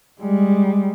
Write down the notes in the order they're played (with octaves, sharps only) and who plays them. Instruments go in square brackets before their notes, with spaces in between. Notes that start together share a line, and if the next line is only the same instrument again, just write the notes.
[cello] G3 G#3